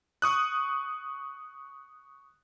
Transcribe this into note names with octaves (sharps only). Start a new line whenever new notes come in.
C#6 D#6 F#6